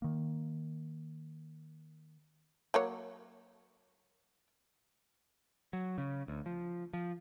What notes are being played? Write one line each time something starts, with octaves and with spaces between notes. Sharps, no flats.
D#3 A#3
F#3 A#3 C#5
F#3
C#3
D2
F3
F3